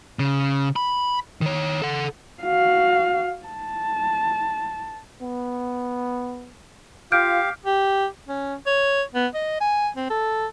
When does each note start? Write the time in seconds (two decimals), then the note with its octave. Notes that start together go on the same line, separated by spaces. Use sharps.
0.19 C#3
0.76 B5
1.41 D#3 C#5
1.82 A4 F#5
2.43 F#4 F5
3.46 A5
5.22 B3
7.12 F4 G4 F5 F6 G6 D7
7.65 G4
8.28 C#4
8.66 C#5
9.14 B3
9.34 D#5
9.61 G#5
9.96 C4
10.10 A4